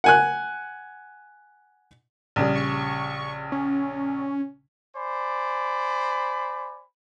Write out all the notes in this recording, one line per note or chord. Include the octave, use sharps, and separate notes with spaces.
F#5 G#5 F#6
A#1 C#3 G3
C#6
C#4
C5 D5 G#5 B5